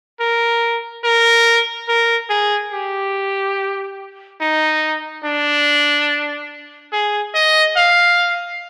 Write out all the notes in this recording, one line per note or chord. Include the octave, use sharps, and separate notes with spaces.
A#4
A#4
A#4
G#4
G4
D#4
D4
G#4
D#5
F5